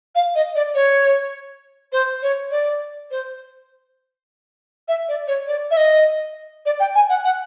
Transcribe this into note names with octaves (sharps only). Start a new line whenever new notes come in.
F5
D#5
D5
C#5
C5
C#5
D5
C5
E5
D5
C#5
D5
E5
D#5
D5
G5
G#5
F#5
F#5